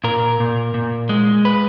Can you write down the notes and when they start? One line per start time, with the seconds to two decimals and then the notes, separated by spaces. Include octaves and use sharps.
0.04 A#2 A#4
0.40 A#2
0.74 A#2
1.09 G#3
1.45 B4